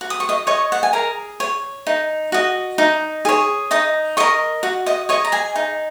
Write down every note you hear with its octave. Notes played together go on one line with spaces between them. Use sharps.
F#4
D#6
C#6
D#5 D#6
C#5 D#5 C#6
F#5
G#5
G#4 A#4 A#5
C#5
D#4
F#4 D#5
D#4
G#4 C#5
D#4 D#5 D#6
A#4 C#5 D#5 C#6
F#4
D#5 D#6
C#5 D#5 C#6
A#5
G#4 G#5
D#4